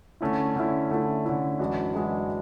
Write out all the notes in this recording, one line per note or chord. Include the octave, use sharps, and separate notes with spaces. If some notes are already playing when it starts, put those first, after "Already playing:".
D3 A3 C#4 E4
D3 A3 C#4 E4
D3 A3 C#4 E4
D3 A3 C#4 E4
F#2 E3 G#3 D4 F#4
F#2 E3 G#3 D4 F#4